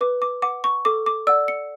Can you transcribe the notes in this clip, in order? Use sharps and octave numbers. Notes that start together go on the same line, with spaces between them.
B4 D6
D6
F#5 D6
C#6
A4 D6
D6
D5 F#5 E6
C#7